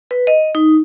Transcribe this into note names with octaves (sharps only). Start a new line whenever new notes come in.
B4
D#5
D#4